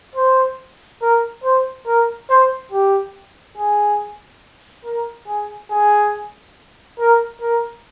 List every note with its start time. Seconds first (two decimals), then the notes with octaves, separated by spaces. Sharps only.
0.15 C5
1.02 A#4
1.44 C5
1.87 A#4
2.30 C5
2.72 G4
3.58 G#4
4.85 A#4
5.27 G#4
5.71 G#4
6.99 A#4
7.41 A#4